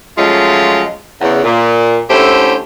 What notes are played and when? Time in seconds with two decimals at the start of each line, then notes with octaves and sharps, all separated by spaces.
0.18 F3 F#3 G#3 A3 C#4 F4
1.21 E2 C#3
1.44 A#2
2.09 D3 A3 C#4 E4 G4 C5